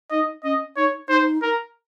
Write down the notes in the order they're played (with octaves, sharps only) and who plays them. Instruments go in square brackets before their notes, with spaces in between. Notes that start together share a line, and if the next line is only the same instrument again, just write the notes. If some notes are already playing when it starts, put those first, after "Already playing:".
[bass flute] D#4 [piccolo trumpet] D#5
[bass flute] C#4 [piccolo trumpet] D#5
[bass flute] D#4 [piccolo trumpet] C#5
[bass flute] D#4 [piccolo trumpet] C5
[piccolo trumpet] A#4